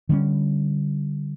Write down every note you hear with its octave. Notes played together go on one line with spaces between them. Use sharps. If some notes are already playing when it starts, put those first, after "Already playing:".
D3 G3 B3 C#4